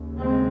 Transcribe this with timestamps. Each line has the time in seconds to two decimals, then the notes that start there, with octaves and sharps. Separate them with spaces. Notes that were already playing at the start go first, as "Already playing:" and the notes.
Already playing: D#2 C#3
0.19 G#3 C4